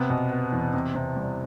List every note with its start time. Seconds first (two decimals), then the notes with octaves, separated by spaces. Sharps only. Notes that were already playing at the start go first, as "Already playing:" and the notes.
Already playing: C3 B3
0.10 B2
0.31 B3
0.52 E2
0.73 C3
0.95 C3
1.16 G3